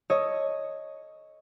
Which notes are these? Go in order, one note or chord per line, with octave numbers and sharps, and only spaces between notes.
A4 C#5 D#5